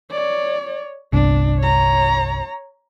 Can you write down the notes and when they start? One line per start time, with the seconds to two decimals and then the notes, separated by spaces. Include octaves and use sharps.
0.11 C#5 D5
1.13 G1 C2 D4
1.58 C#5 A#5